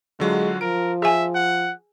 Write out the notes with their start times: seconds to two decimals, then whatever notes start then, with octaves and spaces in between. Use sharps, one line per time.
0.20 D3 F#3 G#3 F4 F#4
0.61 F3 A#4 D7
1.02 G#4 E5 G#5
1.35 F#5